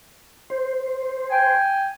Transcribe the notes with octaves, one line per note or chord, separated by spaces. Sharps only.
C5
G5 G#5